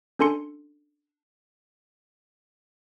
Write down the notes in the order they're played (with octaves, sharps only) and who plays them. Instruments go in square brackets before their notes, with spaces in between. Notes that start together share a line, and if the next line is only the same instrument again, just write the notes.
[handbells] C#4 D4 A4 G#5 C6 C#7